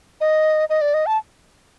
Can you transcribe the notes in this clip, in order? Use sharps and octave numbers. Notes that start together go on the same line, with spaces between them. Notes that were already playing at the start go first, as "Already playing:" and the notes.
D#5
D#5
D5
D#5
A5